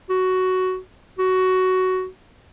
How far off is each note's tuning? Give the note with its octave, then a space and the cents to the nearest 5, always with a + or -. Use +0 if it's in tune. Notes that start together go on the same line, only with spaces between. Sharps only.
F#4 +10
F#4 +10